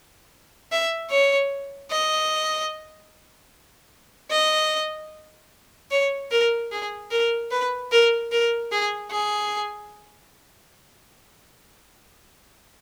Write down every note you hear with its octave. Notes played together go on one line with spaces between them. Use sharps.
E5
C#5
D#5
D#5
C#5
A#4
G#4
A#4
B4
A#4
A#4
G#4
G#4